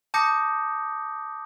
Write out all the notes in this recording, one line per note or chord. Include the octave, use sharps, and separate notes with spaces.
A5 D6 D#6 G6 A#6 C#7